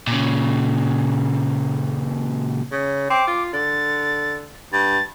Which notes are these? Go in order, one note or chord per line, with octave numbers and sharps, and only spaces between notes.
A#2 C#3
C#3
C4 D6
F4
D3 A6
G2 A6